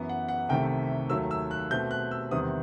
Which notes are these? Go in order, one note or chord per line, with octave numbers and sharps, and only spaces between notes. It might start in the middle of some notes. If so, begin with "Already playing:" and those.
Already playing: F#2 E3 B3
F#5
F#5
C2 C3 D#3 A3 G5
D#2 D#3 F#3 A3 E6
E6
F#6
B2 A3 C4 G6
F#6
E6
E2 C3 D#3 G3 C4 D#6